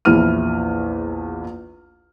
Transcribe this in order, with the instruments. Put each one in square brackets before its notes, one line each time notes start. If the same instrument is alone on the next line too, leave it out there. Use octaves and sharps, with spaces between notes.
[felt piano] A#1 E2 E4 F6 D#7